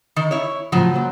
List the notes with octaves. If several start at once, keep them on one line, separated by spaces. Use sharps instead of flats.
D#3
E4 C#5
A2 C#3 F3 F#3
A#3 A4 C5